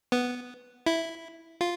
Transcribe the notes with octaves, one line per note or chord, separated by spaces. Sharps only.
B3
E4
F4